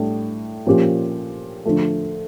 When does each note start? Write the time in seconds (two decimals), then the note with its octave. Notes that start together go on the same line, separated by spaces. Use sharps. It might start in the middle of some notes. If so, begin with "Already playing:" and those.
Already playing: A2 G3 D4
0.67 A#2 F3 C#4 G4
1.65 D3 F3 A3